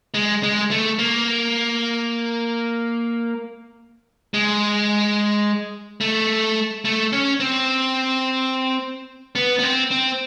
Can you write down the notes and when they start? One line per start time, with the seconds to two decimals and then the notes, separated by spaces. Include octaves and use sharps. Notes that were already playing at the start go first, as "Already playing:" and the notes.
0.14 G#3
0.43 G#3
0.71 A3
0.99 A#3
4.34 G#3
6.01 A3
6.85 A3
7.13 C#4
7.40 C4
9.35 B3
9.59 B3
9.63 C4
9.91 C4